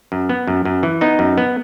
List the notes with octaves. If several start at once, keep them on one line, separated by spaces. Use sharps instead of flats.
F#2
B3
F#2
F#2
E3
B3 D#4 D#5
F#2
B3